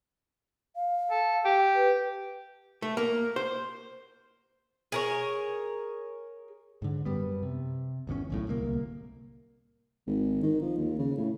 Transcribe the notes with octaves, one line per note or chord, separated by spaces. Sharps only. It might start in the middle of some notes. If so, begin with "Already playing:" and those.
F5
A4
G4
B4
A3
A#3
C5
G#4 A#4 C#5
G#2 D3
F#2 G3 B3
C3
G#1 E2 D3 C#4
D1 B1 A2
D1 C2 D3 A#3
G#1
D#3
F3
D#2
C#3
A2